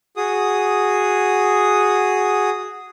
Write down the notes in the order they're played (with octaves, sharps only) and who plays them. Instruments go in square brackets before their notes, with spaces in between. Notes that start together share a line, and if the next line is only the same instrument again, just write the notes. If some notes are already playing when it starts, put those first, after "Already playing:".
[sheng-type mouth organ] F#4 G#4 D#6